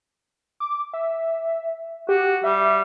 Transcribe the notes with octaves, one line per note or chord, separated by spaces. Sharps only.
D6
E5
F#4 G4
G3 E5